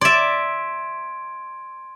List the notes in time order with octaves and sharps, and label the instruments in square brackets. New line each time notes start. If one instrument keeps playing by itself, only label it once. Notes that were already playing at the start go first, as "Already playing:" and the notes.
[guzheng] D5 E5 [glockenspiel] C6 G#6 D7